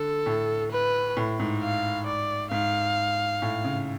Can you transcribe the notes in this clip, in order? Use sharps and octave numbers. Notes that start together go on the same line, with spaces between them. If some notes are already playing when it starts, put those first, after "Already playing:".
Already playing: D3 A4
A2
B4
A2
G#2
F5
D5
G#2 F5
A2
C#3